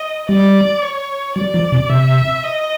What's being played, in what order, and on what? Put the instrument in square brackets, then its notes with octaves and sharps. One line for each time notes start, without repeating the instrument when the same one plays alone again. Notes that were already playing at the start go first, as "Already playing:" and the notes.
Already playing: [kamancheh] D#5
[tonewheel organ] G3 [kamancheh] D5
[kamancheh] C#5
[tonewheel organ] F#3 [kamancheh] D5
[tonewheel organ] F3
C3
[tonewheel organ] C3 [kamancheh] E5
[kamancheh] D#5